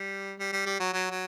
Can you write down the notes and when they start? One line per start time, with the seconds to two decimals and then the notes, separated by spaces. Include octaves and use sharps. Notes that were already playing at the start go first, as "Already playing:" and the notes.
Already playing: G3
0.39 G3
0.52 G3
0.66 G3
0.80 F#3
0.93 F#3
1.10 F#3